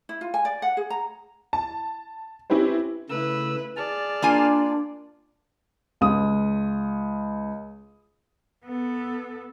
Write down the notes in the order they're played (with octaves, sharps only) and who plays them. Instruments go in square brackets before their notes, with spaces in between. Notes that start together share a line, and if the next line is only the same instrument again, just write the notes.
[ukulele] E4
F4
G#5
D5
F#5
G#4
A#5
[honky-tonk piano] A5
C4 C#4 E4 G4 B4 C5
[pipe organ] C#3 A3 E6 [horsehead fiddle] E4 B4
[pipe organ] G#4 A5 F6 [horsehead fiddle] D5
[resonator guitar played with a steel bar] A#3 F4 G#5 [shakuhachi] D4
[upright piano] C#2 D#6
[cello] B3 A4